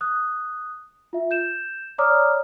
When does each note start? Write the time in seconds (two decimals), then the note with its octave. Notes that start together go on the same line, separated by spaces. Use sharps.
0.01 D#6 F#6
1.13 F4 E5
1.31 G6 E7
1.98 C#5 D5 A#5 D6 D#6 F6